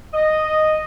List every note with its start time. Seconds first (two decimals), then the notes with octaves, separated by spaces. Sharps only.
0.14 D#5